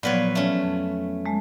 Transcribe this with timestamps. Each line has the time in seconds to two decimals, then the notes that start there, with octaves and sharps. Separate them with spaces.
0.03 A#2 F3 F#3 B3 B4 C#5
0.35 A3 C#4
0.62 F2
1.26 G#3 A3